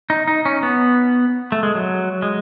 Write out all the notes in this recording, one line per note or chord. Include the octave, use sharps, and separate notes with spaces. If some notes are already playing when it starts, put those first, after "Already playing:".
D#4
D#4
C#4
B3
A3
G#3
F#3
G#3